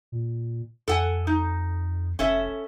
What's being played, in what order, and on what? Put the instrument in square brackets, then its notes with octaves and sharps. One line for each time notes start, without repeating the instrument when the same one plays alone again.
[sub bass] A#2
[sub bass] F2 [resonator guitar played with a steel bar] A4 F#5 G#5
[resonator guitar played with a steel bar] D#4
[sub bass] F1 [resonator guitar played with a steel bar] C#4 A4 E5